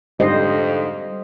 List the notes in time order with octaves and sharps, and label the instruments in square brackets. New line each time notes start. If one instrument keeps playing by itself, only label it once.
[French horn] F2 [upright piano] G#2 D3 C7 [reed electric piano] G3 [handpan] C5 D#5